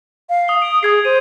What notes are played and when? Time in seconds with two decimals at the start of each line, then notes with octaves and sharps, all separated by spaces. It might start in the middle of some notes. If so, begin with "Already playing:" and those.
0.29 F5
0.48 D#6 G7
0.62 D#6 D7
0.83 G#4 D#6 G#6 C7
1.05 C5 D#7